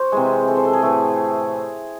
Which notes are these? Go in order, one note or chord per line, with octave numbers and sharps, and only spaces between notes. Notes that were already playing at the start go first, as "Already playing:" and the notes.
Already playing: F#4 C5
C3 E3 G#3
A4
C5
A4
G#4
A2 E3 A3